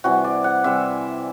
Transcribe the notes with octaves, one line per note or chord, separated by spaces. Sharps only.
C3 E3 G3 F#4
D5
F#5
C3 E3 G3 E5